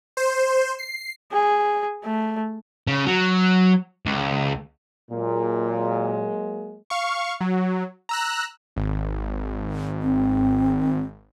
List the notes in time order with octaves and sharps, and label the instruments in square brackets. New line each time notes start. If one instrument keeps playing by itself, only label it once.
[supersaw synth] C5
C7
[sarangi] G#4
A3
[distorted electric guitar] C#3
F#3
C#2
[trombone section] A#2 [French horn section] F#3 G#3 A#3
[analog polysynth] F5 C#6
F#3
A#5 E6 F#6
G#1
[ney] C4